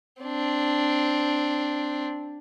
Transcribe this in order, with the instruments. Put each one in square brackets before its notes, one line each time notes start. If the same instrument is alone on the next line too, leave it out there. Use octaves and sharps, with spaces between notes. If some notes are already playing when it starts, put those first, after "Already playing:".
[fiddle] C4 D4